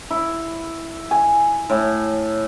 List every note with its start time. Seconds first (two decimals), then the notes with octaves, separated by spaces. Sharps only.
0.10 E4
1.11 G#5
1.70 A2